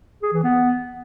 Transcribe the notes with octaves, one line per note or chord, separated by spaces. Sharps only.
G#4
E3
B3